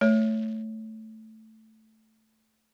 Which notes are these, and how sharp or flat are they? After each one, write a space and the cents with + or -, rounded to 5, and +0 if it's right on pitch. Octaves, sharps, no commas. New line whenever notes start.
A3 +0 C#5 +0